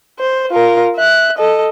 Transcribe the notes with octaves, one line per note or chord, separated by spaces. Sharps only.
C5
F4 A#4
E5 F#6
A4 D#5